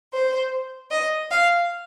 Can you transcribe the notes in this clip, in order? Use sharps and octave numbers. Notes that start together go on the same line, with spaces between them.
C5
D#5
F5